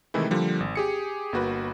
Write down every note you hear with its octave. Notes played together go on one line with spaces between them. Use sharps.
C3 D#3 E3 G#3 A3 E4
D3 F3 G3 A#3
G#1
G4 G#4 C#7
G1 A#3 F#4 B4